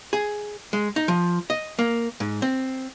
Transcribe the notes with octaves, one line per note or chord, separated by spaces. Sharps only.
G#4
G#3
D#4
F3
D#5
A#3
G#2
C4